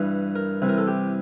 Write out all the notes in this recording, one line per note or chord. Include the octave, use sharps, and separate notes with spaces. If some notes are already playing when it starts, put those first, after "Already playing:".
Already playing: G2 E3
A#4
C2 C3 E3
A#4
A4
G4